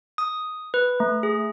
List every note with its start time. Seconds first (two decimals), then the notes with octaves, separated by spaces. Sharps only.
0.18 D#6
0.74 B4
1.00 A3
1.23 G#4